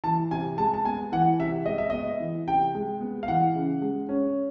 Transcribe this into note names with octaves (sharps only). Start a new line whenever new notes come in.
E3 A5
C3 G#5
G#3 A5
A5
B3 G#5
E3 F#5
C3 E5
G#3 D#5
E5
B3 D#5
E3
C3 G5
G#3
B3
F5
E3 F#5
C#3
G#3
C#4